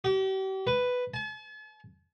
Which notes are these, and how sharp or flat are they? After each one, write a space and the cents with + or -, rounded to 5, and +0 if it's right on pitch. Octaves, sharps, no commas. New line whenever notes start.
G4 -40
B4 +5
A5 -45